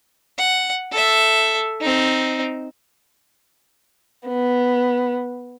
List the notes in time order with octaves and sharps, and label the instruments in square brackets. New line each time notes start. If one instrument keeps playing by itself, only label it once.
[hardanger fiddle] F#5
A4 E5
C4 D#4
[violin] B3